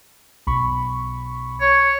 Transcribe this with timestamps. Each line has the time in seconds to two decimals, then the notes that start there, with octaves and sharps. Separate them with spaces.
0.47 B1 B5 C#6
1.60 C#5